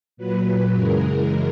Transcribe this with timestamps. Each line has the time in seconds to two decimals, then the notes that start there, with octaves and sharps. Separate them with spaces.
0.17 A#2 F#3 B4
0.72 F#2 C#3 E3 G#3 A#4